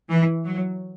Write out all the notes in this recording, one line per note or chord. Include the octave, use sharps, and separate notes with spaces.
E3
F#3